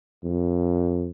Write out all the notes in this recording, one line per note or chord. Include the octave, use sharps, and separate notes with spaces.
F2